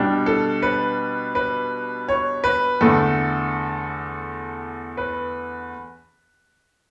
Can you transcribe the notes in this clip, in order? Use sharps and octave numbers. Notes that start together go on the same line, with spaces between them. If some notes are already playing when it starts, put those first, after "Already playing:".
Already playing: B2 G3 D4 G5
A4
B4
B4
C#5
B4
E2 D3 A3 A4
B4